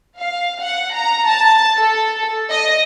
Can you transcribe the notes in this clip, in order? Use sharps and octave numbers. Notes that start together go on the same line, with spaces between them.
F5
F#5
A#5
A5
A4
D#5